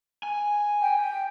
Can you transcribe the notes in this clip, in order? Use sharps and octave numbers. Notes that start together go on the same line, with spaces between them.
G#5
G5